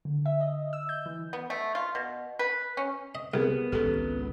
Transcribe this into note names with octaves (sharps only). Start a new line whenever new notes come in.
D3
E5
D#5
E6
G6
E3
B3
A3
F4
B2
B4
C#4
D#5
C2 B3 G4 G#4 A#4
G#1 C#2 G4 A4